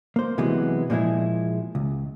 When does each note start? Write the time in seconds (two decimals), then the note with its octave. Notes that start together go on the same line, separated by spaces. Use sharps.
0.16 A#3 C5
0.38 C3 E3 F#3 G#3 B3
0.90 A#2 F3 G#3 E4 G#4
1.75 C#2